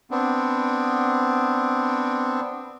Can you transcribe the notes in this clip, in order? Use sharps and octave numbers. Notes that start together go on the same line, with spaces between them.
B3 C4 D4